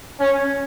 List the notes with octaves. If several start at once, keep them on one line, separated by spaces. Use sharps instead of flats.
C#4